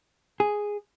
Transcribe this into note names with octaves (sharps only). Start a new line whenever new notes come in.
G#4